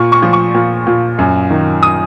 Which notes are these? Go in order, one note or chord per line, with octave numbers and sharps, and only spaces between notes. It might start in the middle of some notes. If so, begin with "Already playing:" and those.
Already playing: A#2 C#6
C#6
F3
C#6
A#2
A#2
F#2
D#3
D#6